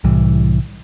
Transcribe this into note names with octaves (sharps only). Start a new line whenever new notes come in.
C2 A2 E3 G3